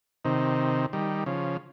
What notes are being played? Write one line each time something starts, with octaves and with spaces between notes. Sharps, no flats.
C3 D#3
D#3 G3
C#3 F3